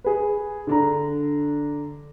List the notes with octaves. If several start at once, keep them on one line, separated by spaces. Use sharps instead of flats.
G#4 B4
D3 D4 A#5